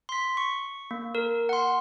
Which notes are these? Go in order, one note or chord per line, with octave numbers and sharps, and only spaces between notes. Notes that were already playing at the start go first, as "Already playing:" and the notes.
C6 B6
C#6
A#3
A#4
F#5 C6